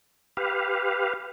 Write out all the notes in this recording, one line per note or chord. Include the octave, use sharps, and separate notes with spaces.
G4 B4 F5